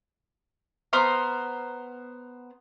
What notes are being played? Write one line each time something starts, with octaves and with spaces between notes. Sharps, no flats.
B3 C5 A#5 F6